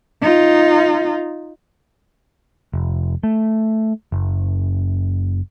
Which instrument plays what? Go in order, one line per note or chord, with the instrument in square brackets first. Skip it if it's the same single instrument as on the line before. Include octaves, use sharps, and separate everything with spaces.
[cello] D#4 F4
[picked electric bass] F1
A3
F#1